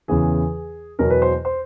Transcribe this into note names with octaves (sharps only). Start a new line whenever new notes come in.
E2 C#3 E3 G#4
E2 B2 F#3 A#4
B4
C5
C5